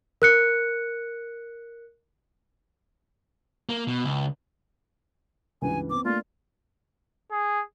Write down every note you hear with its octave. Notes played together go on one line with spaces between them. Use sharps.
A#4 F#6 C#7
A#3
B2
C#2
C#2 G2 E3 G#5
B3 C4 D6
A3 A#3 D4 F4
G#4